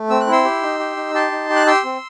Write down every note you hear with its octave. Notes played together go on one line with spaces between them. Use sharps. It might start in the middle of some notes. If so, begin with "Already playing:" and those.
Already playing: A3
C4 E6
F#6
E4 C6 E6
G4
D#4
G4
D#4
G4 A5 C6
D#4
G4
F#6
G4 C6 E6
C4